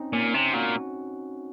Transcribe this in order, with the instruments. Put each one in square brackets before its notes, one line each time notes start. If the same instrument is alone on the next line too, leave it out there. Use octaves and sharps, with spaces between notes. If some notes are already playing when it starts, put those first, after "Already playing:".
Already playing: [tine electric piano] C4 C#4 D#4
[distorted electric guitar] A#2 [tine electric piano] C#4
[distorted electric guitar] C3
[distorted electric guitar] A#2 [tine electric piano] F#4